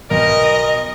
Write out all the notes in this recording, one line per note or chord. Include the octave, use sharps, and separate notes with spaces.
B1 A#4 D#5